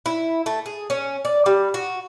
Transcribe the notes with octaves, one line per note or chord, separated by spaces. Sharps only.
E4
A3
G#4
C#4
D5
G3
F#4